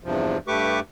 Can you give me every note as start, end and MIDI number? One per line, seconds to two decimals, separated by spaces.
0.04 0.37 40
0.04 0.37 43
0.04 0.37 48
0.04 0.37 53
0.48 0.80 43
0.48 0.80 57
0.48 0.80 67
0.48 0.80 71
0.48 0.80 85
0.48 0.80 86